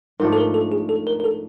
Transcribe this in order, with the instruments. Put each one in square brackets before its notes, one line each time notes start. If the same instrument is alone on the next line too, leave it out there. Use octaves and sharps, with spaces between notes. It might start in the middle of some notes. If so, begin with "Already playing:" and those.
[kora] G#2 F3 A3 D4 [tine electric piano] A#4
[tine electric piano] A4
A#4
A4
G#4
A4
A#4
A#4
A4